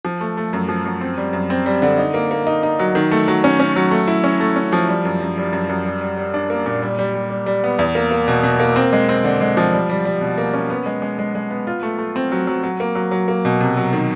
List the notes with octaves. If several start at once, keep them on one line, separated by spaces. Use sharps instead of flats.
F3
A3
A3
F#2
F3
F#2
C4
G3
F#2
C4
G3
D3
D#4
A#3
A#3
D#4
D#4
F#3
D#3
A3
F#3
C#4
C#4
F#3
A3
E4
C#4
A3
C#4
F3
G3
F#2
F#2
G3
F#2
F#2
G3
G3
G3
D4
A#3
A#2
G3
G3
G3
G3
G3
B3
E2
A#3
A#3
B2
B2
A#3
C4
G#3
C4
D3
G#3
F3
G3
G3
G3
B2
A#3
C#4
B3
G#3
G#3
G#3
G#3
B3
F4
A3
A3
C4
F#3
F#3
F#3
A#3
F#3
F#3
A#3
B2
C3
F#3
D#3